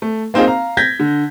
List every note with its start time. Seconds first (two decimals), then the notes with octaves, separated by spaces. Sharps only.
0.02 A3
0.34 A#3 C4 D#4 F4 G#4
0.47 F5 A#5
0.77 G6 G#6 A#6 B6
1.00 D3